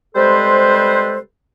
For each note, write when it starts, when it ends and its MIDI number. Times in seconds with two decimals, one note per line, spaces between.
0.15 1.17 48
0.15 1.17 55
0.15 1.17 56
0.15 1.17 69
0.15 1.17 71
0.15 1.17 72